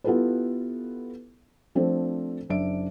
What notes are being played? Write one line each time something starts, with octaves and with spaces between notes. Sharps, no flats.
B3 E4 F4 G4 A4 B4
F3 A3 C4 D4 A4 C5
F#1 D4 E5 D7